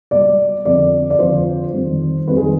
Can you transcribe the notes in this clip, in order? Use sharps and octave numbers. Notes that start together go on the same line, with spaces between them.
B2 G3 D5
F2 D3 F3 D5
D5
F2 D3 F3 C5
F2 D#3 G3
F2 D#3 G3 B4
G#4